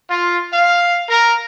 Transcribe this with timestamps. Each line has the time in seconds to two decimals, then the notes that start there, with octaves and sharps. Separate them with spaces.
0.10 F4
0.52 F5
1.09 A#4